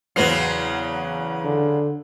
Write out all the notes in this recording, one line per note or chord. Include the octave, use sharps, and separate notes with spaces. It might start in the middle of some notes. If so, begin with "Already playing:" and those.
E2 C#3 F#3 C4 B4 C7
D3